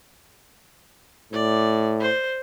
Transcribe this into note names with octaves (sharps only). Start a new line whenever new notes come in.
A2 D5
C5